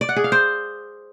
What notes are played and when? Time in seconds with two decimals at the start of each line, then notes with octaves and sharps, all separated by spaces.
0.01 D5
0.09 F#5
0.16 G#4
0.24 F5
0.32 C5